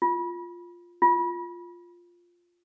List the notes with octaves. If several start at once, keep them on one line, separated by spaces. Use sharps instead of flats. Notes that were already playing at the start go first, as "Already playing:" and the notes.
F4
F4